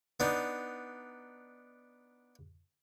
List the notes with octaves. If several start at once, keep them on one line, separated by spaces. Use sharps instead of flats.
B3 D4 D#4